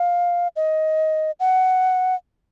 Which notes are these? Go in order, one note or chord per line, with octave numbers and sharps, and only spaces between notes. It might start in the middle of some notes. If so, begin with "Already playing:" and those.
Already playing: F5
D#5
F#5